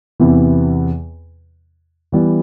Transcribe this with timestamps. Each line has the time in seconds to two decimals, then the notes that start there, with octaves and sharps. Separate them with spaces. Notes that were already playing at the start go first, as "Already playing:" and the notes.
0.20 E2 C3 E3 B3 E4
2.12 E3 G3 B3 E4